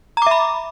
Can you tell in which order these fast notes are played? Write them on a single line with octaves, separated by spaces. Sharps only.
A#5 D6 E5 B5